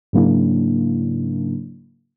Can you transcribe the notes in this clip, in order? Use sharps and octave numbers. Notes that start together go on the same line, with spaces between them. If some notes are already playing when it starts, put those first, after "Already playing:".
G#2 C#3 F#3 A#3 D4 E4